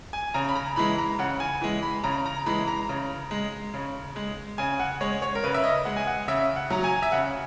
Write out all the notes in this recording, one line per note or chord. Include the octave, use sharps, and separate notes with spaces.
G#5
C#3 A#5
B5
A#5
E3 G#3 B5
A#5
C#3 F#5
G#5
E3 G#3
B5
C#3 A#5
A#5
E3 G#3 B5
A#5
C#3
G#3
C#3
G#3
C#3 G#5
F#5
G#3 C#5
C#5
A#4
C#3 B4
E5
D#5
G#3 F#5
G#5
F#5
C#3 E5
F#5
F#3 A#5
G#5
E5
C#3 F#5